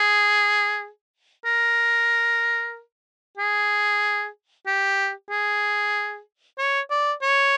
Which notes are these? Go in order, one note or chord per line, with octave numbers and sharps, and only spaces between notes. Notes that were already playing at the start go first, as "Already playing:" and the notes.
Already playing: G#4
A#4
G#4
G4
G#4
C#5
D5
C#5